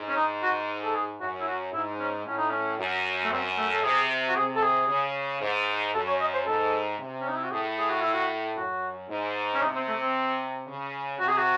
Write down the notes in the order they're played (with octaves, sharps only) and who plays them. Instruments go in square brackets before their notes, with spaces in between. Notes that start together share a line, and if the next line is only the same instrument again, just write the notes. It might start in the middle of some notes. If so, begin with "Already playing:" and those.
Already playing: [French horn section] G#2
[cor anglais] C#4
D#4
F#4
A4
G#4
[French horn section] F#2 [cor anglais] F#4
[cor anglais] E4
F#4
[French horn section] G#2 [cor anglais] E4
[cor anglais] C#4
[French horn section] A2 [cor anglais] C#4
[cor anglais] D#4
C#4
[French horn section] F#2
[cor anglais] A3
[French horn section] F#2 [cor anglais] C4
[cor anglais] A3
A4
[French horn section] C3 [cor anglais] G#4
[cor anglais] F#4
[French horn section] C3 [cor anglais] G#4
[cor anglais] A4
G#4
[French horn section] C#3
G#2
[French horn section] F#2 [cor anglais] A4
[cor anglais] C#5
D#5
C5
[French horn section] G#2 [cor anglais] A4
[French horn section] C3
[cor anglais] C#4
D#4
E4
F#4
[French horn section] A2 [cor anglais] G#4
[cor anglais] G#4
F#4
E4
F#4
[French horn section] F#2 [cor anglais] F#4
[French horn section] G#2
[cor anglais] C#4
[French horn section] C3 [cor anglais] D#4
[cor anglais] C4
A3
C4
[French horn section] C#3
[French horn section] C3 [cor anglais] F#4
[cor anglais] G#4
F#4